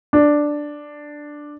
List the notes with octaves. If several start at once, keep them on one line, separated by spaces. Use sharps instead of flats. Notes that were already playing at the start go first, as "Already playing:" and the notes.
D4